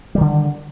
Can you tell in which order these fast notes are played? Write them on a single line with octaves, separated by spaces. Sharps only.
G3 D#3 D3